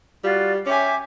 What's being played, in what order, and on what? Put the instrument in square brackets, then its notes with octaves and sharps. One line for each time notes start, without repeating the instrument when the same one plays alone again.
[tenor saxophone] G3 [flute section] F4 F#4 D5
[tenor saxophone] C#4 [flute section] E5 G5 G6 [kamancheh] G#5 D6